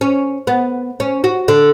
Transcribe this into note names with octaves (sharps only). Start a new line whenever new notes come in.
C#4
B3
C#4
F#4
D3